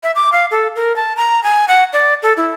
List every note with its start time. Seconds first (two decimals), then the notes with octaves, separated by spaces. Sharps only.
0.03 E5
0.15 D6
0.32 F5
0.51 A4
0.76 A#4
0.96 A5
1.17 A#5
1.44 G#5
1.68 F#5
1.93 D5
2.23 A4
2.37 E4